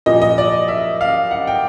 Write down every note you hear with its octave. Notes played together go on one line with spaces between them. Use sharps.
A#2 F3 D#5
D#5
D5
E5
F5
F#5
G5